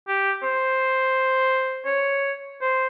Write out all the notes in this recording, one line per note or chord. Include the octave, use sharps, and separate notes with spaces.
G4
C5
C#5
C5